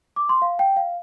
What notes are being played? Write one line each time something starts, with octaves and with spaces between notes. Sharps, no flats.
D6
C6
F5
G5
F5